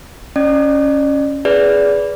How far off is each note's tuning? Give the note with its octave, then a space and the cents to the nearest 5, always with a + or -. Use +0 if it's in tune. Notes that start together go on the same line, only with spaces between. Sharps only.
C#4 +0 D5 +40
G#4 +0 B4 +0 D5 -25